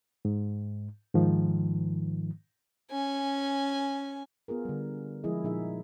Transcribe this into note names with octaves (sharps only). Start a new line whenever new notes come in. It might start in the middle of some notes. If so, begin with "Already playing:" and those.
G#2
G#2 D#3 F3
C#4 G#5
B3 F4 G#4 A#4
D3 G3
F3 G#3 E4 G#4 D#5
A#2 F3 D#4 G#4 E5